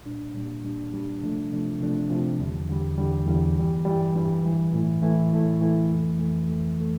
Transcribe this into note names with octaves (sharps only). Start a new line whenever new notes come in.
A#2 G3 D4
A#2 G3 D4
A#2 G3 D4
A#2 G3 D4
C3 F3 A3 D4
C3 F3 A3 D4
C3 F3 A3 D4
C3 F3 A3 D4
E2 D3 G3
E2 D3 G3
E2 D3 G3
E2 D3 G3
G2 E3 G3
G2 E3 G3
G2 E3 G3
G2 E3 G3
A2 E3 A3 E4
A2 E3 A3 E4
A2 E3 A3 E4
A2 E3 A3 E4
F2 E3 A3
F2 E3 A3
F2 E3 A3
E3 A3